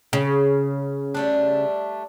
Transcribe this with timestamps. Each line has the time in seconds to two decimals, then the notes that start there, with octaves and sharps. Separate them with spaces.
0.13 C#3
1.15 G3 A3 D4